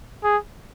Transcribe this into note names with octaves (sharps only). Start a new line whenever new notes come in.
G#4